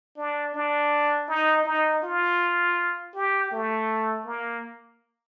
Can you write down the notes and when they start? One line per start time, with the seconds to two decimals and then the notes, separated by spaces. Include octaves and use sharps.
0.17 D4
0.55 D4
1.29 D#4
1.65 D#4
2.03 F4
3.14 G4
3.51 A3
4.25 A#3